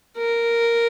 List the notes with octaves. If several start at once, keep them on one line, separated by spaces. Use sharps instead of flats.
A#4